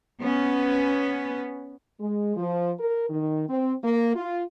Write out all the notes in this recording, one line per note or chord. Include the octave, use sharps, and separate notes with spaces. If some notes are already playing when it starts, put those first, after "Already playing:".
B3 C#4
G#3
F3
A#4
D#3
C4
A#3
F4